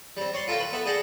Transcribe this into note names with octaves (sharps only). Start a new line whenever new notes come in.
G3 C4
C#5 D5 C6
F4 A4 A#4 E5 F5 G5
B4
B3 A4 E5
G#4 D5 F#5 G5 A5 A#5